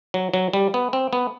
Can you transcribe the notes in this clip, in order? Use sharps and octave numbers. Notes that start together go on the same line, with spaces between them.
F#3
F#3
G3
B3
C4
B3